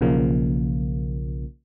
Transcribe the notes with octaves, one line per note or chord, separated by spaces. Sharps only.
B1 C#3 F3 A#3